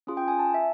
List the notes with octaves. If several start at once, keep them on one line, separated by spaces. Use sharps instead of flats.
C#4 F4 G#4
G5
G#5
A5
E5